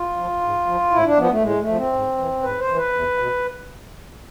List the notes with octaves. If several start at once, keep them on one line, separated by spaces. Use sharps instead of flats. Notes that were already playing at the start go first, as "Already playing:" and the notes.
Already playing: F4
F3
G#2
F3
A2 E4
D4
F3 B3
A3
A2 G#3
A3
F3
C4
G#2
E3
G#2 B4
C5
E3
B4
E2
B2